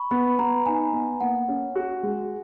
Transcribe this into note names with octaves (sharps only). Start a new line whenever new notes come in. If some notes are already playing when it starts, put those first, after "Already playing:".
Already playing: B5 C#6
B3 B5
B3 A#5
D#4 G#5
B3
A#3 F#5
C#4
F#4
G#3